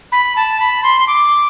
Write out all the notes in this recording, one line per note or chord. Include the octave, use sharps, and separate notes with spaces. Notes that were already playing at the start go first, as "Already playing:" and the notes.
B5
A5
B5
C6
D6